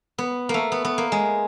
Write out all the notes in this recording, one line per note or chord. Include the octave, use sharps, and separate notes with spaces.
B3
A3 A#3
B3
B3
A#3
G#3